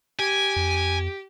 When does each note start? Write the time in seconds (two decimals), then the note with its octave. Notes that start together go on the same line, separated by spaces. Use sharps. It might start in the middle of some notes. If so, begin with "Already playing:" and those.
0.20 G4 G#5
0.56 F2